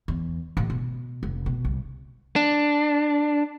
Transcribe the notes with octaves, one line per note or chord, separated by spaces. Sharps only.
E2
A1
B2
F1
B2
C2
D4